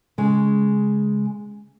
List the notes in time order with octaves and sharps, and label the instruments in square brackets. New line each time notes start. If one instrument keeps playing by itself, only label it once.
[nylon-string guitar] C#3 G#3